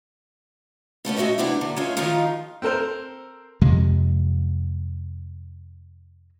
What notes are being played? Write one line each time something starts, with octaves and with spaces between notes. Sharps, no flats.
B2 A3 B3 C#4
G#3 A3 F#4 D#5 E5
C3 E3 B3 C4 D4 E4
D3 A#3
G#3 A3 C#4 E4 F4
D#3 F3 G#3 D#4 F4
C4 A4 A#4 C5
F2 C3 G#3